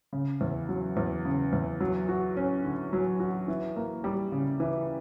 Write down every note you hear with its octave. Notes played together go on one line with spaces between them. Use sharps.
C#3
E2
F#3
E2
C#3
E2
F#3
F#4
C#4
D3
F#3
F#4
E3
A#3
G3
C#3
E3